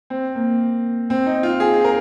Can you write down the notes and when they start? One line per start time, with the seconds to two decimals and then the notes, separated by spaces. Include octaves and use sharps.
0.10 C4
0.35 A#3
1.10 C4
1.26 D#4
1.43 F4
1.60 G#4
1.85 A#4